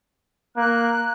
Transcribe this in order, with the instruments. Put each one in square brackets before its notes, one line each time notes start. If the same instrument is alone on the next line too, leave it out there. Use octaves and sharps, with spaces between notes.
[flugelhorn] A#3 [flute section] F#6